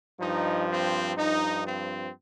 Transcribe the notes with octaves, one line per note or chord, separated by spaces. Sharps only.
G2 F3 D#4
C4
G2 F3 D#4
C4